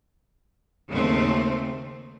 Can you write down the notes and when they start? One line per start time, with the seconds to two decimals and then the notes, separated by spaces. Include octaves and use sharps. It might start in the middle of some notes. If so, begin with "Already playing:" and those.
0.90 D#2 C#3 A3 C4